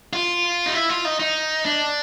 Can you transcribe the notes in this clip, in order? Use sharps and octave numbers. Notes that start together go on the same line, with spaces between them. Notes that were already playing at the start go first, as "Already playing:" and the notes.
F4
D#4
E4
F4
D#4
D#4
D4